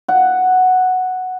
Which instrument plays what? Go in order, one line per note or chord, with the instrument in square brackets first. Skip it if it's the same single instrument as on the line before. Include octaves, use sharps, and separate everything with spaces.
[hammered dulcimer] F#5